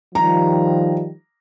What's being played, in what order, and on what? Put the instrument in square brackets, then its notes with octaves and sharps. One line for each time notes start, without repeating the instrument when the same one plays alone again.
[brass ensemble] D#3 F3 G3 [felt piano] A#5